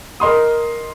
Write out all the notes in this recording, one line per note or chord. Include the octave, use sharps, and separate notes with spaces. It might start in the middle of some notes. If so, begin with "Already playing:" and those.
A#4 D#5 C6 D#6